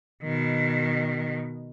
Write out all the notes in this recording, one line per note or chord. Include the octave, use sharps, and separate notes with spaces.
B2 D#3